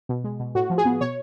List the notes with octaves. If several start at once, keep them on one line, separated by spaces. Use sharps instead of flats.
B2
G#3
B2
A2 F#4
F3
G#4
B3
B2 C#5